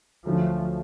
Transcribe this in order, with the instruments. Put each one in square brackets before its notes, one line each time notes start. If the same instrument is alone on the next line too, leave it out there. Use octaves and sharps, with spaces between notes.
[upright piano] D2 D3 F#3 A3 [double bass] F3